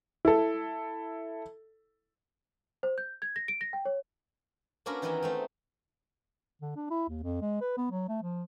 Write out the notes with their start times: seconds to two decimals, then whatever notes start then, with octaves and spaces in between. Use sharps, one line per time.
0.25 E4 A4
2.83 C5
2.98 G6
3.22 G#6
3.36 A#6
3.48 D7
3.61 A#6
3.73 G5
3.86 C#5
4.86 A#3 C#4 D4 F#4 A#4 B4
5.02 D#3 E3 B3 D#4 A#4 E5
5.22 A3 C4 D#4
6.62 D3
6.76 D4
6.91 E4
7.09 D#2
7.23 F2
7.42 G#3
7.61 B4
7.77 B3
7.91 F#3
8.09 A3
8.23 F3